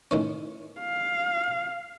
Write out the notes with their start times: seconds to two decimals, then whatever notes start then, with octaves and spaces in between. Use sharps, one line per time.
0.11 A2 D#3 C#4
0.80 F5